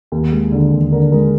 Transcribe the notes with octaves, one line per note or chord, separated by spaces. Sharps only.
D#2
G#3
D3
D#2
D3 A#4
G#3 A#4